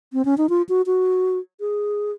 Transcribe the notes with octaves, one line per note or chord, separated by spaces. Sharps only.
C4
C#4
D#4
F4
F#4
F#4
G#4